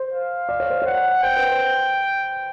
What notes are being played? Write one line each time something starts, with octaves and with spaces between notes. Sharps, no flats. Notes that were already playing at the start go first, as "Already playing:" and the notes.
Already playing: C5
F5
D5
C#5
C5
C#5 F#5
C5 G5
B4
C5